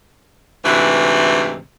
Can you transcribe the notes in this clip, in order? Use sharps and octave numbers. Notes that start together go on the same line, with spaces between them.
D2 G#2 C3 E3